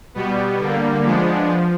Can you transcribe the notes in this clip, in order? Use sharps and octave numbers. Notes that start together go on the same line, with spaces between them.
B2 G3 B3
D3 G3 A#3
F3 G#3 B3 D4
F3